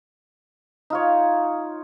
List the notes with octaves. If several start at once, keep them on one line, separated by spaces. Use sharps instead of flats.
D#4 F4 C#5